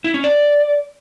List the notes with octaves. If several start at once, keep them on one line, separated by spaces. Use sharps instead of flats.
E4
C#4
D5